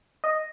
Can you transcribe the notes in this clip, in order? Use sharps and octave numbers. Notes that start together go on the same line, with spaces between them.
D#5